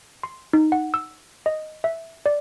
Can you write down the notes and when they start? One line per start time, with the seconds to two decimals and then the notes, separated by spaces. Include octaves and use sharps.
0.23 C6
0.53 D#4
0.72 F#5
0.94 E6
1.46 D#5
1.84 E5
2.26 D5